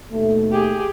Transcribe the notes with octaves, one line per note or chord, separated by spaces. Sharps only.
D#2 B2 A3
G4 G#4